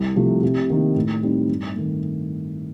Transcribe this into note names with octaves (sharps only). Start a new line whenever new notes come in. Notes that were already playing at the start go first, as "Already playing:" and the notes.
Already playing: C2
C3 F3 A3
C3
D#3 A#3 D#4
A2
G3 C4 D#4
G2
D#3 A3